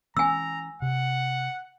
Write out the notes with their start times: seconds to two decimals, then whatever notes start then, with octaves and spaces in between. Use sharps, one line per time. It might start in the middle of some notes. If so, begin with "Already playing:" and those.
0.17 E3 C#4 G#5 A#5 E6
0.82 C3 F#5